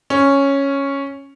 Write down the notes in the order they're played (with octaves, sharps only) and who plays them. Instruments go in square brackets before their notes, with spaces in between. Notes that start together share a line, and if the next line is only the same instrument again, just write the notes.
[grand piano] C#4